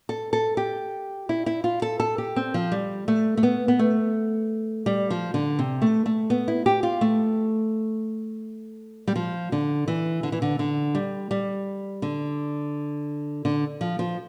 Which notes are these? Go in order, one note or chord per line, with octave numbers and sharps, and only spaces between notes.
A4
A4
G4
E4
E4
F4
A4
A4
G4
C4
F3
G3
A3
A3
B3
B3
A3
G3
F3
D3
C3
A3
A3
B3
E4
G4
F4
A3
G3
F3
D3
E3
D3
E3
D3
D3
G3
G3
D3
D3
F3
F3